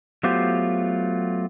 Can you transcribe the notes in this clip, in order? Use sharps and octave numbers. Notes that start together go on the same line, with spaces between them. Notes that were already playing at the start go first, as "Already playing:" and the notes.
F#3 A3 B3 F4 G4 C5